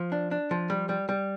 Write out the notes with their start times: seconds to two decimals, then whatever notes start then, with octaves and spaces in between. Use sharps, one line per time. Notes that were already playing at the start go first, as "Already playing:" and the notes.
Already playing: F3
0.12 D4
0.31 D4
0.51 F3
0.70 G3
0.89 G3
1.09 G3